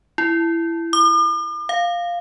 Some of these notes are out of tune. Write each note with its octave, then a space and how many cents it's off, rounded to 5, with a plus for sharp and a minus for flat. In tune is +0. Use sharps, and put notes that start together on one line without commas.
E4 +15
D6 +45
F5 +0